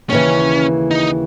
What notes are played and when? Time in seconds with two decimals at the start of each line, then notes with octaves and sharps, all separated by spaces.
0.10 D#2 C#3 E3 C#4
0.91 D#4